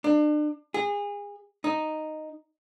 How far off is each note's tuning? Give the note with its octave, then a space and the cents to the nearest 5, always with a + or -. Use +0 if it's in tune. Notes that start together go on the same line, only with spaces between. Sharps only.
D4 +35
G#4 -30
D#4 -5